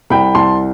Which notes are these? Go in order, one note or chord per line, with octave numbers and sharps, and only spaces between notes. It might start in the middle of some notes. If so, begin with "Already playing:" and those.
C2 G5 B5
C2 A5 C6